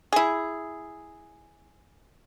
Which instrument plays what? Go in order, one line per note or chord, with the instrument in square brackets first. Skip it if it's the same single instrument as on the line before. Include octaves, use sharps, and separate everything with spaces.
[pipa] E4 G#4